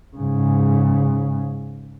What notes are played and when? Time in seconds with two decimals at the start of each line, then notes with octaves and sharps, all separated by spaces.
0.17 G#2 C#3